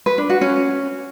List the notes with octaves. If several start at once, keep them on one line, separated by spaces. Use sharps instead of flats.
B4
D4
F#4
C#4